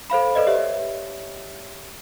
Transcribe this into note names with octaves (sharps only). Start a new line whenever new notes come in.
A4 C5 F5 B5
A4 B4 D5 D#5
G4 C#5 E5